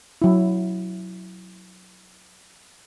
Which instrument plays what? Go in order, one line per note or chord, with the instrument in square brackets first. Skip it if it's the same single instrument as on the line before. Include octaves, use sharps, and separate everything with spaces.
[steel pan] F#3 E4